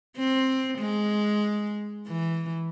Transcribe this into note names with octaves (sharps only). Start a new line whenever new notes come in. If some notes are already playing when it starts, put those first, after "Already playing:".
C4
G#3
E3